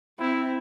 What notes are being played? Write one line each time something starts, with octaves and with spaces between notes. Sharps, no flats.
C4 E4